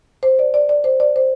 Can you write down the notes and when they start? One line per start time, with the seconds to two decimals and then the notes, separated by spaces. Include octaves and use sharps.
0.23 C5
0.39 D5
0.54 D5
0.69 D5
0.84 C5
1.00 D5
1.16 C5